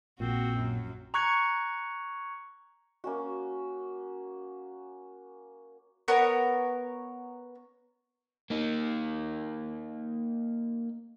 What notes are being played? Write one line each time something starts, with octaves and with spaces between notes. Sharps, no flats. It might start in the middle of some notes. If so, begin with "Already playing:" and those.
A#1 A#2 C4 F#4
F#2
A#5 C#6 F#6 G#6 C#7
A#3 C#4 F#4
B3 A#4 C#5
A#3 D#4